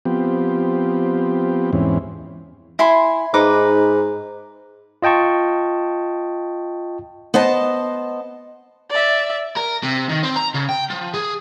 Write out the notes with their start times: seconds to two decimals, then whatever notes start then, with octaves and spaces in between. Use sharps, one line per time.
0.05 F3 B3 C4 G4
1.73 E2 G#2 E3 C4 C#4
2.79 E4 G#5 C6
3.34 G#2 D#4 B4 D6
5.02 F4 D#5 G5 A5 C#6
7.34 B3 C5 D#5 A5
8.89 D5 E5
9.57 A#4
9.84 C3
10.10 D#3
10.24 C4
10.37 A#5
10.55 C#3
10.69 G5
10.90 F3
11.14 G#4